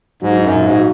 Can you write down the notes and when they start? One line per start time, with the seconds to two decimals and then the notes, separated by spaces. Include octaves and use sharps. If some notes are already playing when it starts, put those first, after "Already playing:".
0.22 G#2 F#3
0.38 D#4
0.43 F#2
0.54 A#2
0.65 G#2
0.70 F#4